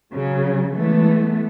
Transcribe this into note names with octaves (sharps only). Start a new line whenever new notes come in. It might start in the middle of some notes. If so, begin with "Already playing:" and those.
C#3 F#3
E3 G#3 A3 B3